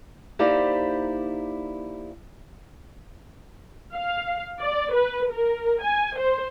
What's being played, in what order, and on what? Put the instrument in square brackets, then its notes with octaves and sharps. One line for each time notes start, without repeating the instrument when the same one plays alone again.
[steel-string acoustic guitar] A#3 D#4 E4 G4 C5 D5
[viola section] F5
D5
B4
A#4
G#5
C5